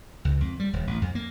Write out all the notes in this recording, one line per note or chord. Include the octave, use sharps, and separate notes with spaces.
C#2
F2
G3
D#1
A1
F2
A#3